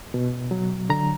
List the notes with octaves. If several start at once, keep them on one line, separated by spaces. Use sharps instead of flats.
B2
F#3
D3 A#5